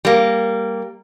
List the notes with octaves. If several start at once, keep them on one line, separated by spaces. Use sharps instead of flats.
G3 A#3